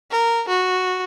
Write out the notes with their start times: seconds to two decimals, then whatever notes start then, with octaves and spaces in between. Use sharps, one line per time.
0.10 A#4
0.48 F#4